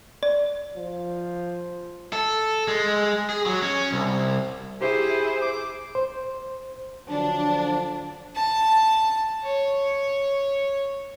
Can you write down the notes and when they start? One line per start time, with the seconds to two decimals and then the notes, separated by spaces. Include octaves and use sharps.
0.23 D5
0.77 F3
2.13 A4
2.68 G#3
3.30 G#4
3.46 F#3
3.62 C#4
3.92 C2
4.81 E4 G4 G#4 C5
5.42 D6
5.95 C5
7.10 D3 F3 F#3 D4
8.35 A5
9.43 C#5